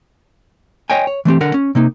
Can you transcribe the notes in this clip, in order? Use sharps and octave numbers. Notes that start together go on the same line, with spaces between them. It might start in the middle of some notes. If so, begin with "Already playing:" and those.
C#5 D#5 G5 G#5
C#5
E3 A3 C4 G4
D3 A#4 F#5
C#4
C3 A#3 D#4